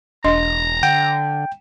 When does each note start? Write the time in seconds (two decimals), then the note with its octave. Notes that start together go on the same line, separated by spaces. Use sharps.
0.24 E1 D4 D#5 A#5 C6
0.83 D3 F#5 G5